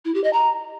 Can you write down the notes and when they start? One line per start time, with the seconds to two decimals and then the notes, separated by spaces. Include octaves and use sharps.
0.05 E4
0.14 G4
0.24 D#5
0.33 A#5